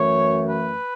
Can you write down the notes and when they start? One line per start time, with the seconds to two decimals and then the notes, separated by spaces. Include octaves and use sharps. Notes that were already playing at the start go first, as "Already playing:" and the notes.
Already playing: F#2 E3 A3 C#5
0.49 B4